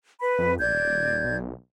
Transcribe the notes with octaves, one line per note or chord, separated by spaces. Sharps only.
B4 B5
F2
A#1 D5 G6 G#6
D#1
B1